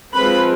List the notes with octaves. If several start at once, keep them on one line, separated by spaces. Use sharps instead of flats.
F3 G#3 C4 B4 B5